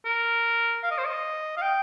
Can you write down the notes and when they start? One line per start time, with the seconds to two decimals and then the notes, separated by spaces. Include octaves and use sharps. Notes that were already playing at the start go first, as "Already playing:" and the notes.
0.05 A#4
0.83 F5
0.91 D#5
0.98 C5
1.05 D#5
1.57 F5
1.61 G5